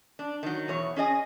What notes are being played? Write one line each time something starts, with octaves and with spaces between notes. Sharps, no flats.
D4
D#3 F#3
E2 B2 C#5
C#4 G#4 D#5 G#5